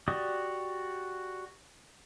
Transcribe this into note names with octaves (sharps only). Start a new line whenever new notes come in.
F#4 G4 D5 D#6